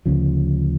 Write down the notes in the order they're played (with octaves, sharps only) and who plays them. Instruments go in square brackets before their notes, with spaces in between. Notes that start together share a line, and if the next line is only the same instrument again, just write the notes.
[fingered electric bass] D2 C#3 F3